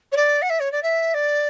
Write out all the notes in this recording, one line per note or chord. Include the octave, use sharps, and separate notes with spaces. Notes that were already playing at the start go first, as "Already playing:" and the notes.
C#5
D5
F#5
E5
C#5
D5
E5
D5